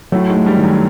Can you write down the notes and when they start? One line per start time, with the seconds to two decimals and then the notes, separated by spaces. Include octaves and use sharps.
0.12 A2 F#3 A3
0.29 G#2 G#3
0.35 A3
0.46 G2 G3
0.57 D#3
0.63 F#2 F#3